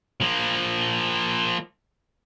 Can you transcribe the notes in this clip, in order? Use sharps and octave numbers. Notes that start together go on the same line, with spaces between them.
F3 A#3